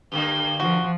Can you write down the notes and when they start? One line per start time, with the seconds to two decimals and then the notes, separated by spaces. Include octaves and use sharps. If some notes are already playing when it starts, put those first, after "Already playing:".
0.12 G2 D3 A#3 G7
0.60 F3 F#4